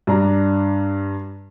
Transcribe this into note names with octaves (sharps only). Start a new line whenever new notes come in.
G2 D4 A#5